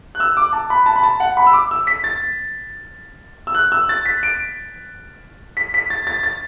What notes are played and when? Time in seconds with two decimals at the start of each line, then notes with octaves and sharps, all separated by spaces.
0.15 F#6
0.20 E6
0.37 D6
0.53 A5
0.70 B5
0.86 A5
0.96 B5
1.03 A5
1.20 F#5
1.37 B5
1.47 E6
1.53 D6
1.71 E6
1.87 B6
2.04 A6
3.47 E6
3.55 F#6
3.72 E6
3.89 A6
4.05 B6
4.23 D7
5.57 B6
5.74 B6
5.90 A6
6.07 A6
6.23 A6